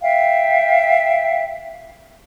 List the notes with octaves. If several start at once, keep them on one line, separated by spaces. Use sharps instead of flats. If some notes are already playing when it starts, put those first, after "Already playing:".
E5 F5 G5